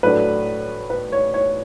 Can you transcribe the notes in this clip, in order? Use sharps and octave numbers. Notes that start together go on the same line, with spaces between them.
A2 F#3 A3 D4 B4
B4
C#5
C#5